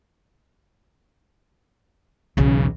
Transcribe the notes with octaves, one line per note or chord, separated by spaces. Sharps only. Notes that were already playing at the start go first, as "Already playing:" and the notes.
B1 E2 C#3